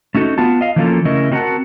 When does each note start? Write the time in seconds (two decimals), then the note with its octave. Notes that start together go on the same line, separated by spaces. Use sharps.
0.15 A3 C#4 D#4 F#4 A4
0.38 B3 F4 A5
0.61 D#5 F5
0.76 E3 F3 A#3 C#4 F4 A4
1.05 C#3 A3 C#4 E4 A#4 D#5
1.32 C4 F#4 A#4 B4 F#5 A5